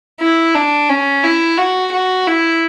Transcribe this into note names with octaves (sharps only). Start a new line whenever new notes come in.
E4
D4
C#4
E4
F#4
F#4
E4